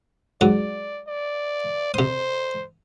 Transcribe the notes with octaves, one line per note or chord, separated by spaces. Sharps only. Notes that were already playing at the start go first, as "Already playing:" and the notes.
G#2 F#3 D5
D5
C3 C5 D#6